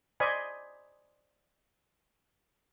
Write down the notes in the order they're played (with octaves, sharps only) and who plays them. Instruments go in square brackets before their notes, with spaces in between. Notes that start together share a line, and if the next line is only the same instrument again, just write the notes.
[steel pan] C5 D5 D#5 G#5 B5